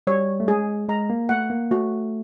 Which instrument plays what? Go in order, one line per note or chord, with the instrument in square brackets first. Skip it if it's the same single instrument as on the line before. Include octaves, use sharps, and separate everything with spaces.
[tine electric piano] G3 [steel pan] C#5
[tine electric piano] A3
[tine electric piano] G#3 [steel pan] G#4
[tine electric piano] G#3 [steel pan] A#5
[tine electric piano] A#3
[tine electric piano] A3 [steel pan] F#5
[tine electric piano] A#3
[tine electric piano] A3 [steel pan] F#4